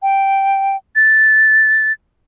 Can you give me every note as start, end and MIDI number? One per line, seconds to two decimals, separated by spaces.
0.02 0.76 79
0.96 1.92 93